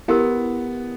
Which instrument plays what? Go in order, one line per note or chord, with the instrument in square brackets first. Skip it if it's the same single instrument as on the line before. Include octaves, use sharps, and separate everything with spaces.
[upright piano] B3 [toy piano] E4 G4 A#4